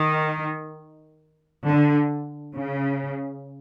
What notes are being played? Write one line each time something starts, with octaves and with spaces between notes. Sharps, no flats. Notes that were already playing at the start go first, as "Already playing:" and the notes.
Already playing: D#3
D3
C#3